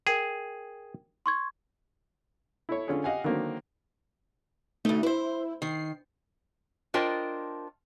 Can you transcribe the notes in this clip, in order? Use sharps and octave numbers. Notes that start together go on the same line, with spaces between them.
G#4 A#4 G5
C6 C#6 G#6
E4 A4 C#5
D3 C#4 F4 G#4 A4
G4 D#5 F5 F#5 G#5
D3 D#3 F#3 A#3 C4
D2 A3 D#4
E4 B4 C5
D#3 C7
D4 F4 A#4 C5 D#5 G5